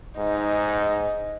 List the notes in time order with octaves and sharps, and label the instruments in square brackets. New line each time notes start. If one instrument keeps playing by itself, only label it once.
[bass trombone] G#2 [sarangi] D#4